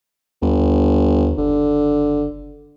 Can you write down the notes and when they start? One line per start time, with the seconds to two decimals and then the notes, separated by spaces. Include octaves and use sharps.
0.42 G1 D#2
1.37 F#1 D3